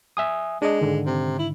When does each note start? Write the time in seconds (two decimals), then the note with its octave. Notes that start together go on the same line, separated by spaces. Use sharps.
0.17 E5 G#5 D#6
0.62 G#3 D4 D#5
0.81 G#2 D3 D#3
1.06 C3
1.39 E4